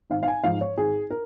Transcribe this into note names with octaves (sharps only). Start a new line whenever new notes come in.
G#1 F5
F5
G#5
G#2 F3 G#3 F5
C#5
G#1 G#4
A#4